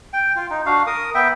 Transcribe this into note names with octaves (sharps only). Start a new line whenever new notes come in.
G5
F4
D#4
D4 F#4 F5
A#4 D#6
B3 E5 G5